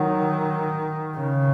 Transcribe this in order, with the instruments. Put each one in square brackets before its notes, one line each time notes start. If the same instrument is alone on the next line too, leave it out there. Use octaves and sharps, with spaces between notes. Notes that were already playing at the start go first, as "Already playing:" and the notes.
Already playing: [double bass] D#3 [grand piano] F#3
[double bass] C#3